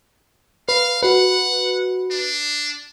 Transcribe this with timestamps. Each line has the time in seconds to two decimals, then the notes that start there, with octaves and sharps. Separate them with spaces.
0.69 B4 F5
1.03 F#4 B4 F#5
2.11 D4